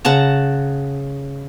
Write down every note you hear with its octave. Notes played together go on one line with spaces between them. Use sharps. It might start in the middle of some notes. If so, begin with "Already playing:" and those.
C#3 F#5 A5 A#5